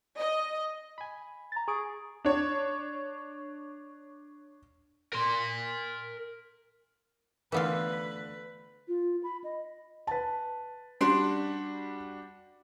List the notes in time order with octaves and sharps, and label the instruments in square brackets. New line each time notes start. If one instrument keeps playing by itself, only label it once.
[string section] D#5
[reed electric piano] G#5 B5
[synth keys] A#5 A6
[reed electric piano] G#4 [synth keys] C#6 D#6 D7
[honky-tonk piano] D4 C#5
[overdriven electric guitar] A#4 C6
[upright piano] D3 A3 [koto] E3 B3 F4 [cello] B4
[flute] F4
B5
D#5
[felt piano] B4 A5
[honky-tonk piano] G3 D4 F#4 [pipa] D5 C6